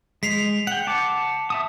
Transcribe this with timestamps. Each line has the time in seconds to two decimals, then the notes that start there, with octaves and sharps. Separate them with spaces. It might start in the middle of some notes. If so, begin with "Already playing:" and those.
0.23 G#3 B6 C7 F7
0.67 F#5 G5 C#7
0.87 F#5 A5 D6
1.50 E5 A5 D#6